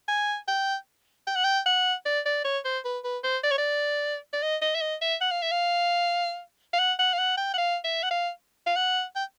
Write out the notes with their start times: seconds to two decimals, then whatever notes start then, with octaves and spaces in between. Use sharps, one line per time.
0.08 G#5
0.48 G5
1.27 G5
1.35 F#5
1.44 G5
1.66 F#5
2.06 D5
2.26 D5
2.44 C#5
2.65 C5
2.85 B4
3.04 B4
3.23 C5
3.44 D5
3.51 C#5
3.58 D5
4.33 D5
4.42 D#5
4.62 D#5
4.75 E5
4.81 D#5
5.01 E5
5.21 F#5
5.31 F5
5.42 E5
5.52 F5
6.73 F5
6.79 F#5
6.99 F#5
7.13 F5
7.19 F#5
7.37 G5
7.54 F#5
7.58 F5
7.84 E5
8.03 F#5
8.11 F5
8.67 F5
8.76 F#5
9.16 G5